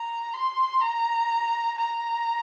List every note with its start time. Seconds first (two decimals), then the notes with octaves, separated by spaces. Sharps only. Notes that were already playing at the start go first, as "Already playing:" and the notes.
Already playing: A#5
0.34 C6
0.81 A#5
1.78 A#5